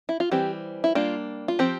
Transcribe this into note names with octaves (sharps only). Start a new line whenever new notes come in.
E4
F4
E3 G3 C4 G4
E4
G3 A#3 D4 F4
F4
F3 C4 G4